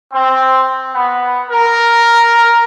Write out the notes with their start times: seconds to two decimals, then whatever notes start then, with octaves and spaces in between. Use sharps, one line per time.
0.14 C4
0.95 B3
1.50 A#4